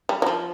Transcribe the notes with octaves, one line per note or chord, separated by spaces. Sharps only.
G3
F#3
F3